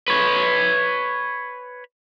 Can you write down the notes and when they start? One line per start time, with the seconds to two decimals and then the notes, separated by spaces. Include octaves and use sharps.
0.08 B4 C#5